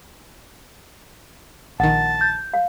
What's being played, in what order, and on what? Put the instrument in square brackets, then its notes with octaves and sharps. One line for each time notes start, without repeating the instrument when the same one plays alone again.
[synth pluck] A#1 D#3 [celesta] F#5 [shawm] A5
[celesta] G6
[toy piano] F5